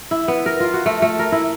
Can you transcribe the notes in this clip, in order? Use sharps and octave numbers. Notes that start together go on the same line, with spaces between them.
E4
B3
A#4
F4
F#4
A3
A3
A#4
E4